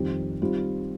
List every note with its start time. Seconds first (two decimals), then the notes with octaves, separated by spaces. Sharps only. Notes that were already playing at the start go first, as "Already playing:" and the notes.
Already playing: F2 D#3 G3 C4 G4
0.42 D#3 G3 C4 F4